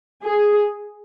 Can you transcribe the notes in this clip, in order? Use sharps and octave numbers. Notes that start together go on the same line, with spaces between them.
G#4